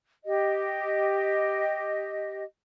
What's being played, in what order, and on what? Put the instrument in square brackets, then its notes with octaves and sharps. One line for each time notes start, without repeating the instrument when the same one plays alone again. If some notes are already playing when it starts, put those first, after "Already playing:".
[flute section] G4 D#5